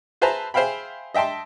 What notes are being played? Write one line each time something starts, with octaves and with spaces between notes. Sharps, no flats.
G#4 B4 C5 E5 A5 A#5
G#4 C5 E5 F5 G5 B5
D#5 E5 G5 A5 C6